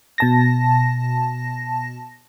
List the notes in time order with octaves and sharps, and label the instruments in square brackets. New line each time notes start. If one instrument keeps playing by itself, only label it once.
[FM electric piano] B2 A5 A#6